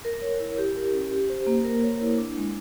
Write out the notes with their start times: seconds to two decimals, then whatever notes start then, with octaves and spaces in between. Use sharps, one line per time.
0.05 A#4
0.22 C#5
0.40 E4
0.58 G4
0.76 A#4
0.94 C#4
1.11 G4
1.30 C5
1.47 A#3
1.64 A#4
1.83 C#5
2.01 E4
2.18 D4
2.37 G#3